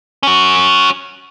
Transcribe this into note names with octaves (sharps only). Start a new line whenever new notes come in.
C#4 F#4